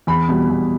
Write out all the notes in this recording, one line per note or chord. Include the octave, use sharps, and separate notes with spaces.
E2 B5
B2 G3
E2